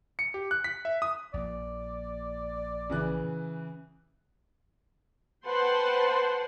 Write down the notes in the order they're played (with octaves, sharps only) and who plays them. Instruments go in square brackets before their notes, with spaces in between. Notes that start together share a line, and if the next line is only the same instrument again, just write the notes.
[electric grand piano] C#7
G4
F#6
B6
E5
D#6
[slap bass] A#1 A#2 A#3 [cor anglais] D5
[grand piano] C#3 E3 F#6
[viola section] B4 C5 F#5 G5 A5 C6